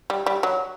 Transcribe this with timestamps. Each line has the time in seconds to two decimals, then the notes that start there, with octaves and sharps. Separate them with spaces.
0.10 G3
0.26 G3
0.43 F#3